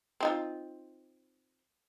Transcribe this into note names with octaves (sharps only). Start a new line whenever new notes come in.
C4 D#4 F4